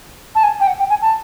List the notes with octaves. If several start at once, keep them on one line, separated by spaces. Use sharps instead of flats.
A5
G#5
G5
F#5
G5
G#5
A5